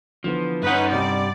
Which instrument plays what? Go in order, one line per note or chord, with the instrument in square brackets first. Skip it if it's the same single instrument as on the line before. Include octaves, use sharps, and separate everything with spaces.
[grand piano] D3 E3 B3 [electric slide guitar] F3
[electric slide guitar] G2 F#5 [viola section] C#4 D#4 B4
[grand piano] C3 G3 [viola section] D5